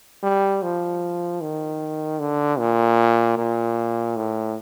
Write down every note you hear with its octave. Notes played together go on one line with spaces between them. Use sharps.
G3
F3
D#3
D3
A#2
A#2
A2